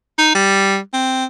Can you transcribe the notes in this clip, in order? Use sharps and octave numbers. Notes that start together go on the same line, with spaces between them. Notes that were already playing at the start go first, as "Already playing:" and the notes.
D#4
G3
C4